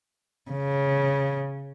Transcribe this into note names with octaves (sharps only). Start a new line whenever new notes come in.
C#3